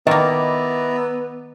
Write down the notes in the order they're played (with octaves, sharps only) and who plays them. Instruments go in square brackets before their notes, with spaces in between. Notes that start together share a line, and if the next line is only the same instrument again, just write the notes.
[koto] D#3 A#3 [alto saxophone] B3 [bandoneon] E4 D5 A#5 [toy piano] D#5